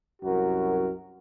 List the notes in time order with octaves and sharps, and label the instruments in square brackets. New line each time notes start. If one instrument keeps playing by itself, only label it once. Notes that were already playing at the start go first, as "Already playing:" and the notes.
[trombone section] C2 F#2 F#4 A#4